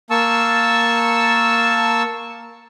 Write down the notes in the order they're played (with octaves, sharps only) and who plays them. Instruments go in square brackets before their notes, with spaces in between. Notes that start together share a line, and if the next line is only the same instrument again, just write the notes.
[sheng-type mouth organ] A#3 A5 C#6 E6